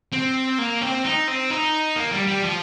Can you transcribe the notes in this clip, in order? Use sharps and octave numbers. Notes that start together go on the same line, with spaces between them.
C4
A#3
C4
D#4
C4
D#4
A#3
G3
G3
F3